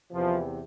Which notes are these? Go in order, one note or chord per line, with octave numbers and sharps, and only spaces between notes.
E2 C3 E3 F3